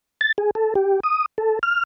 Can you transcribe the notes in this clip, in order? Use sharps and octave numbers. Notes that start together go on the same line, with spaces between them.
A6
G#4
A4
G4
D#6
A4
F6